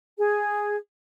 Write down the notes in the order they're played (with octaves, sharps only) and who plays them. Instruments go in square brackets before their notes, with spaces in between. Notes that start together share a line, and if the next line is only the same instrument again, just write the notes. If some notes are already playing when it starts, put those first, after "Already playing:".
[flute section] G#4